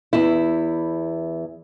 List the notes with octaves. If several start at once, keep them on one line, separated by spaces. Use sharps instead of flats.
E2 E4